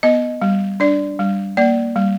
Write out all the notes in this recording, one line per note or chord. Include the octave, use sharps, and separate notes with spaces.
B3 D#5
G3
D4 D5
G3
A#3 D5
G3